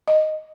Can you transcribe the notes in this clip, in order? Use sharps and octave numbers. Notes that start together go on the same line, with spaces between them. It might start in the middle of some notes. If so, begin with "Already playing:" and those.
D#5